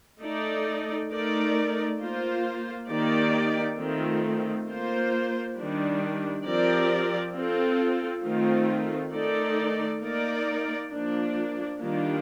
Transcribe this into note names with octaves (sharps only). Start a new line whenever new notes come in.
A3 D#4 A4 D5
A3 D#4 A#4 D5
A#3 F4 C5
D#3 A#3 D#4 G4 D5
D#3 A3 C4 F4
A#3 F4 C5
D#3 G3 D4
F3 C4 G4 A#4 D5
C4 F4 A4
D#3 A3 C4 F4
D#3 A3 D#4 A4 D5
A#3 D#4 A#4 D5
F3 A#3 D4
D#3 G3 A#3 D4 F4